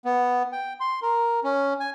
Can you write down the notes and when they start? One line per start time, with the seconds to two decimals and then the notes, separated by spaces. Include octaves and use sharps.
0.05 B3
0.52 G5
0.80 C6
1.02 A#4
1.43 C#4
1.80 G#5